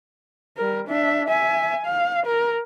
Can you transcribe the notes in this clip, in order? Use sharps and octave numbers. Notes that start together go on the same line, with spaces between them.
G3 A#4
D4 E5
E5 G#5
F5
A#4